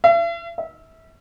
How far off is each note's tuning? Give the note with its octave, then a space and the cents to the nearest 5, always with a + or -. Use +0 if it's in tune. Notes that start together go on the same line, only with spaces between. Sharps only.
E5 +45
E5 -25